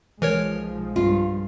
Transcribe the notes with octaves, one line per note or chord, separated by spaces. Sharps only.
B1 E3 F3 G#3 A#4 C#5
G2 F4